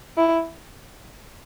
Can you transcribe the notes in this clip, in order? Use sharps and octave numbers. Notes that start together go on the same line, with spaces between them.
E4